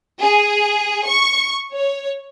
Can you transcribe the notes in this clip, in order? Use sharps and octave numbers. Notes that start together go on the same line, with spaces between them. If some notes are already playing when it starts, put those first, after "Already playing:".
G#4
C#6
C#5